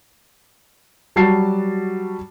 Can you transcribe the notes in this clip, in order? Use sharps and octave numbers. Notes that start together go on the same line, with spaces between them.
F#3 G3 F#4 A5 A6 C7